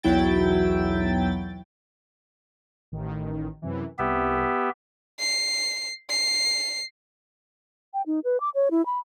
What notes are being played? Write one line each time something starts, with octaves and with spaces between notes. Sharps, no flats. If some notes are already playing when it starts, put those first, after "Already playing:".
B1 E2 F#3 E4 G5 A6
A1 D#3
F#2 C3 E3
C2 B3 G4 E5
C7
C7
G5
D#4
B4
D6
C#5
E4
B5